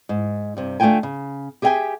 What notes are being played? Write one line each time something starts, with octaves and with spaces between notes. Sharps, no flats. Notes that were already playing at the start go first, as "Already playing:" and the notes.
G#2
G2 C3
D3 A3 D4 F4 G5 G#5
C#3
G4 G#4 E5 F5 G5 G#5